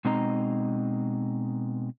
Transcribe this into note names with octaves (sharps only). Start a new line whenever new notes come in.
B2 G#3 C4 D#4 D#5 A#5